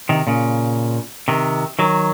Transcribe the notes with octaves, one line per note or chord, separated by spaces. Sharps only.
C3 D#3
A#2 C#3
C3 D#3
D#3 F#3